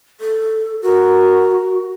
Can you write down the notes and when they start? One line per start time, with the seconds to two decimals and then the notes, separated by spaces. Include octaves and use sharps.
0.20 A4
0.82 F#4 A#4